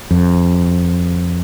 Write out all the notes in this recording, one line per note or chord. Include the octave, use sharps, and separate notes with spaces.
F2